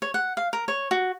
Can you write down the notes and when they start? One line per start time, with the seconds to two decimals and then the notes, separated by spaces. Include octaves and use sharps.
0.02 C#5
0.14 F#5
0.37 F5
0.53 A#4
0.68 C#5
0.91 F#4